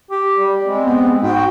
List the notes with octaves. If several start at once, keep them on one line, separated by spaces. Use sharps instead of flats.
G4
G3
G#3 C4
B3
G#2 F#4 G5